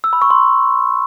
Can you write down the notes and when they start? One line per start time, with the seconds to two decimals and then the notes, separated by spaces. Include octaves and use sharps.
0.04 E6
0.13 B5
0.22 C#6
0.30 C6